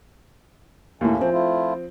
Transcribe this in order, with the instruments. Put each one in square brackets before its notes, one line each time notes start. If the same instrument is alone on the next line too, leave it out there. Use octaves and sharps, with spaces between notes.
[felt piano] D#2 A2 [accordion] A3 A#3 C#4
[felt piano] F3 C4
[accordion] A3 E4 F4